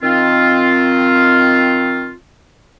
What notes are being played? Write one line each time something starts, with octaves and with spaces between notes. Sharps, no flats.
D#3 C4 F4